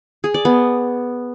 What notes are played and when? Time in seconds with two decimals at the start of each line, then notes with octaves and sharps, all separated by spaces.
0.24 G#4
0.34 D5
0.45 B3